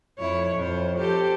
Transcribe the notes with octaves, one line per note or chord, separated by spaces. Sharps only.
F2 E4 C#5
F2 C5
G4 A4 C5